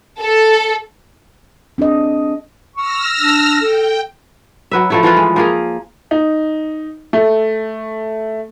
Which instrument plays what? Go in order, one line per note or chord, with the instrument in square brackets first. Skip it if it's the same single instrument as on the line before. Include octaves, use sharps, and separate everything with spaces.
[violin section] A4
[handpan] C4 D4 G#4 D#5
[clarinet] C#6 [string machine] E6 F6 A#6
[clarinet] D4
[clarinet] A4 [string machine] G5
[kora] F#3 B4 E5
F3 A3 E4
E3 F3 F4 B4
G#3
F3 A#3 G#4
[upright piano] D#4
A3